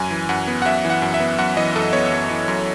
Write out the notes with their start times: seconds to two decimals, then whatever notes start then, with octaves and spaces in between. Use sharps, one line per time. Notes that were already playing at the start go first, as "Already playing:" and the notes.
Already playing: F#2 G#5
0.11 E3
0.29 F#2 F#5
0.47 B3
0.62 F#5
0.65 F#2 E5
0.85 E3
0.90 F#5
1.02 F#2
1.14 E5
1.20 B3
1.38 F#2 F#5
1.57 E3 D#5
1.76 F#2 A4
1.93 B3 C#5
2.12 F#2
2.30 E3
2.48 F#2